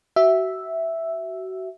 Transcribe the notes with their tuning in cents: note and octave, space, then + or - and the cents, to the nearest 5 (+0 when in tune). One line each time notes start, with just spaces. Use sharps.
F#4 +30 E5 +0